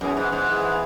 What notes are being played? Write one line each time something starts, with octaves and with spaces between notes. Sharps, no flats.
F#2 E3 B3 E4 G#4
G#2
G#2
E3 B3 E4 G#4